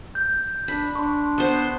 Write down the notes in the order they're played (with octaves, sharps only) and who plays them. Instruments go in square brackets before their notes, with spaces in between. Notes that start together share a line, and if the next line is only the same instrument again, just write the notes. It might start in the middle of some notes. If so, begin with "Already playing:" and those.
[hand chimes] G6
[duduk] D4 [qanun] B5
[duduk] D4 [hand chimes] C6 C#6
[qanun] B3 C5